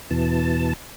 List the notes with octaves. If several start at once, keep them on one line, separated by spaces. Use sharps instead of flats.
E2 B2 E3 A5